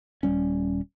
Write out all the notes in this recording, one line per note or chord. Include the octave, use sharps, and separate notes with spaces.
D#1 D#2 G3 C#4